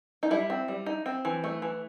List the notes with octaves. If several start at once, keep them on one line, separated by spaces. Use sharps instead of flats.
D#4
G3 E4
C4
G3
D#4
C4
E3
A3
E3